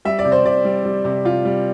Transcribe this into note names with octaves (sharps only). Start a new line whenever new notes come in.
G3 E5
D5
C3
C5
C3 D5
G3
G3
C3
C3 F4
G3